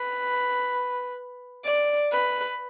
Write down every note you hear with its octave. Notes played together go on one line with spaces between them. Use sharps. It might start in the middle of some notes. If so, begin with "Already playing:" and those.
Already playing: B4
D5
B4